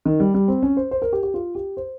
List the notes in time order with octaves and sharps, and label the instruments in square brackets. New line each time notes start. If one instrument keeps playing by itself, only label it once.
[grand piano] D#3
G3
G3
C4
C#4
C5
C5
A#4
G4
G4
F4
G4
C5